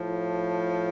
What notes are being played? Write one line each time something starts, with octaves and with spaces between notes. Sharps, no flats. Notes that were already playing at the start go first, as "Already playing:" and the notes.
Already playing: A2 F3